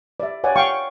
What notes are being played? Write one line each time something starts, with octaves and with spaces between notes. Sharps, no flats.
D5 E5
C#5 D5 F#5 G#5
F5 G5 C#6